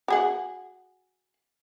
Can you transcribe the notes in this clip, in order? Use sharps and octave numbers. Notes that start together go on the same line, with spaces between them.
F#4 G#4 F#5